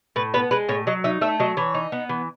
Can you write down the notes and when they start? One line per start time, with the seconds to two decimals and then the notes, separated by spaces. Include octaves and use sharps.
0.16 A2 B4
0.34 B3 B4
0.51 G#3 B4
0.69 A2 C#5
0.87 F#3 D#5
1.04 D#4 E5
1.21 A3 E5
1.40 F#3 D#5
1.57 E3 C#5
1.74 D#4
1.92 B3
2.09 E3